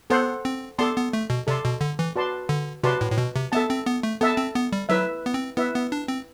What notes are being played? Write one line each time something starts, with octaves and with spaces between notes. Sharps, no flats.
B3 A4 C5 F#5
C4
B3 A4 D5 A5 C6
B3
A3
B2
C3 A4 D5 A5 C6
B2
D3
E3
F#4 B4 D5 A5 C6
D3
C3 F#4 B4 D5 A5 C6
A2
A2
B2
C3
B3 A4 E5 A5
C4
B3
A3
B3 A4 E5 A5
C4
B3
G3
F#3 E4 B4 E5
B3
C4
B3 E4 B4 E5
B3
D4
C4